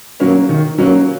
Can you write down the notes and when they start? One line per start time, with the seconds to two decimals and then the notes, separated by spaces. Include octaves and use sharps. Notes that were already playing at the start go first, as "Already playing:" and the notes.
0.20 F#3 A#3 C#4
0.49 D#3
0.78 F#3 A#3 C#4